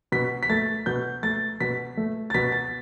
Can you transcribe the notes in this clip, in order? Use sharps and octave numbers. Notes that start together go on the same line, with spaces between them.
B2 B6
B6
A3 A6
B2 G6
A3 A6
B2 B6
A3
A6
B2 B6
A6